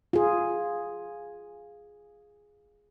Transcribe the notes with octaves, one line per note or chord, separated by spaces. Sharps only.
F4 G#4